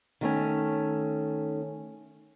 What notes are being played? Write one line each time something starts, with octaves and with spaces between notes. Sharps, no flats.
D#3 A3 C#4